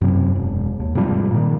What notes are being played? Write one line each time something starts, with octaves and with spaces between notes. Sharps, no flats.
F#2 C3
E1
D#2
G#2 C3 F3 G3
A#2 D#3